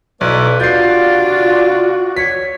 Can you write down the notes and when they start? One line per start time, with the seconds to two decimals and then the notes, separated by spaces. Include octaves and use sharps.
0.21 B1 A3 E4 B4 D5
0.60 C3 D4 F4 F#4 D5 G6 C7
2.17 C#5 B6